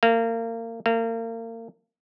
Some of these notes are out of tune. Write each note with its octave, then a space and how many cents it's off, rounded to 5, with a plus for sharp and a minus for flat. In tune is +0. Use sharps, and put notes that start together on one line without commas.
A#3 -30
A#3 -35